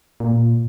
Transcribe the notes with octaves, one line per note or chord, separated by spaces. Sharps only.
A#2